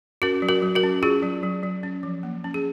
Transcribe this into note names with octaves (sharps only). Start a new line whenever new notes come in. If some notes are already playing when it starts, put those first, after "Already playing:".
C#4 F#4 A#4
F#3
F#4 A#4
F#3
F#4 A#4
C#4
C#4 F4 G#4
F#3
F#3
F#3
C#4
F3
A#3
C#4
G#4